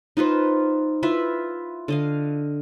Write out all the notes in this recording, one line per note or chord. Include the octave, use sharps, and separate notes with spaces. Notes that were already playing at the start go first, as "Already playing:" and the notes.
D#4 F4 B4 C5
E4 F4 B4 E5
D3 D#5 F5